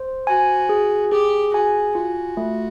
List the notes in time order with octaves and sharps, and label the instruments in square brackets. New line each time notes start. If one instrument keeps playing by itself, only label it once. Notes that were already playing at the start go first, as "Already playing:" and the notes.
Already playing: [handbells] C5
[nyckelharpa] F#4 [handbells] G#5
[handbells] G#4
[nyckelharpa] G4 [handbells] G#4
[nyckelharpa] F#4 [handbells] G#5
[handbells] F4 [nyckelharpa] F#4
[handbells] A3